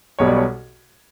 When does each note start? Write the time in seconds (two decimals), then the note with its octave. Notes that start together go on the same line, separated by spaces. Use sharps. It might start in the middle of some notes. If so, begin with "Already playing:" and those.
0.19 B1 B2 G3 C#5
0.28 D5
0.36 C#5